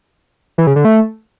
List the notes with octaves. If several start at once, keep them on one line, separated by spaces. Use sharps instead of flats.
E3
C#3
D3
A3